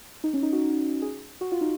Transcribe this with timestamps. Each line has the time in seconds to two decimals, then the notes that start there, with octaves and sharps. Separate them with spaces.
0.24 D#4
0.33 C#4
0.43 D#4
0.53 F#4
1.02 G#4
1.41 F#4
1.52 F4
1.61 D#4